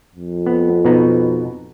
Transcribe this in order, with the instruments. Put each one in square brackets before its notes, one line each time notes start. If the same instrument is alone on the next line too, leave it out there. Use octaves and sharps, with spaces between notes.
[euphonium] F2
[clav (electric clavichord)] B3
B2 B3 D#4